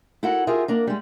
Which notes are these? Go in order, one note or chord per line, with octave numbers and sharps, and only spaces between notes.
E4 F#4 A4 A#4 F#5
F4 G4 G#4 A#4 E5
A#3 D4 A#4
G3 G#3